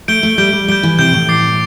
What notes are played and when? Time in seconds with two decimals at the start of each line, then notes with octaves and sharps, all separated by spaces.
0.08 A3 G6 D7 G7
0.23 A3
0.38 G3 G6 D7 G7
0.53 G3
0.68 G3 G6 D7 G7
0.83 E3
0.98 C3 G6 D7 G7
1.13 A2
1.29 D6 A6 C7